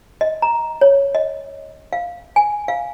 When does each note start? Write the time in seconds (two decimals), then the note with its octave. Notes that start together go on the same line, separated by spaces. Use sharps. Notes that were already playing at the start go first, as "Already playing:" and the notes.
0.21 D#5
0.42 A#5
0.81 C#5
1.15 D#5
1.93 F5
2.36 G#5
2.68 F5